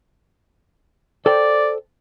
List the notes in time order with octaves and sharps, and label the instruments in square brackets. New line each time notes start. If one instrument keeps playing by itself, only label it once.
[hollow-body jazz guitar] A4 C5 G5 [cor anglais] D5